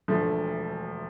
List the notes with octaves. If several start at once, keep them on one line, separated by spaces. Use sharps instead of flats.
E1 D2 D3 F3 A3